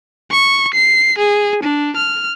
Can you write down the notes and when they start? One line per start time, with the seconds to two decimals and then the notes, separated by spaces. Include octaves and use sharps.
0.31 C#6
0.74 C7
1.18 G#4
1.63 D4
1.96 F6